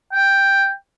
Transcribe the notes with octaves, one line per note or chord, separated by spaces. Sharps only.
G5